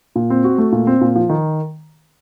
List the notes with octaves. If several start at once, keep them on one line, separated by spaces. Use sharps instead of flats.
A#2
C4
F#4
A3
A#2
C4
A#2
F3
D#3